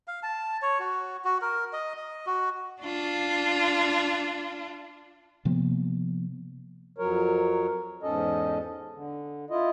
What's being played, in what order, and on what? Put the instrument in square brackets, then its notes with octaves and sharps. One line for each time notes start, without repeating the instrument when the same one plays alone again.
[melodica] F5
A5
C#5
F#4
F#4
A#4
D#5
D#5
F#4
[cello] D4 F4
[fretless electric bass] C3 F3 A#3 B3
[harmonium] F2 F#3 A#4 C#5
E2 G#2 C#4 A4 D#5
D3
E4 F4 D#5